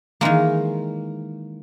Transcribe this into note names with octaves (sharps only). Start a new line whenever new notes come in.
D#3 E3 G#3 A#3